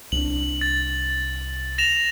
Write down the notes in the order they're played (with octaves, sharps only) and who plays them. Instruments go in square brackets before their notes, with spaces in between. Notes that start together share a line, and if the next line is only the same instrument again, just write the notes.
[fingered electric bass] C2 D4 [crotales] F#7
[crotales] A6
A#6 E7 F7